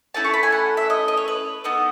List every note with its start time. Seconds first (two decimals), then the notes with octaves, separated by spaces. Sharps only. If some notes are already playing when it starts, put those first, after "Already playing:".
0.14 A3 C#4 E4 A4 A5
0.24 C#6
0.34 B5
0.43 G#5
0.52 F#5
0.77 E5
0.90 D#5
1.08 D#5
1.17 C#5
1.28 B4
1.64 B3 D#4 A4